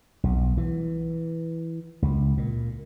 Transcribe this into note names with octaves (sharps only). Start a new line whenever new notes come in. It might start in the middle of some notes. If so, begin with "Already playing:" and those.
B1
E3
C#2
A#2